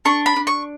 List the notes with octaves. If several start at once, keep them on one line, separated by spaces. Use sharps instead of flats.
D4 C#6
B5
D4
C#6